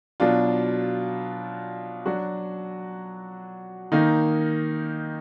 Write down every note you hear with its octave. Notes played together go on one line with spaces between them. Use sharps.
B2 F#3 D4 F4
F#3 D4 F#4
D#3 A#3 D#4